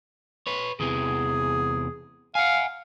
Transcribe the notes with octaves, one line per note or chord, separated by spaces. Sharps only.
B4 C#5
E2 C3 E3 G#4
F5 F#5 G#5